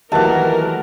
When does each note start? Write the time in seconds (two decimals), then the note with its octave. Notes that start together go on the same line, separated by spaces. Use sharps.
0.12 D#2 E3 F#3 A3 A#4 F#5 A5